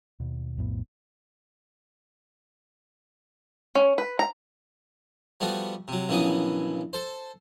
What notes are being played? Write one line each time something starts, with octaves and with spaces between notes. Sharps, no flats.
D#2 B2
B1 F2 A2 B3
C#4
B4
A#5
F3 G3 A3 B3 F#4
C3 F#3
A#1 C#3 E3 F#3 B3 D#6
A4 C5